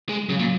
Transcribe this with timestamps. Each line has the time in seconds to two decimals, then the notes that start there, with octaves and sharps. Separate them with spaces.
0.09 G#3
0.29 C#3 F#3
0.39 A#2